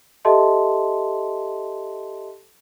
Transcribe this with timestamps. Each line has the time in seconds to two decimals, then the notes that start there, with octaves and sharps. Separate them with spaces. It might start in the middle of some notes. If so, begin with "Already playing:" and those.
0.25 G4 A4 D#5 E5 A5 C6